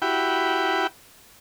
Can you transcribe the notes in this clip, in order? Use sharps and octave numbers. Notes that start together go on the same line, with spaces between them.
E4 F#4 G4 G5 B5